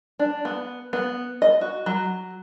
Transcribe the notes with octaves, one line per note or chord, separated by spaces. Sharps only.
D4
B3
B3
D#5
F#4
F#3